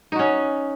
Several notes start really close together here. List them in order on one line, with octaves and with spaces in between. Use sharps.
D#4 F#4 C#4